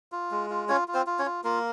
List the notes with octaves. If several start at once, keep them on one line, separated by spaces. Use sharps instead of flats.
F4
G#3
F4
C#4 F4 C#5
F4
C4 C5
F4
C#4 C#5
F4
A#3 F4 A#4